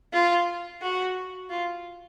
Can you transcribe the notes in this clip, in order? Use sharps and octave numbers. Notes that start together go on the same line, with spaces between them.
F4
F#4
F4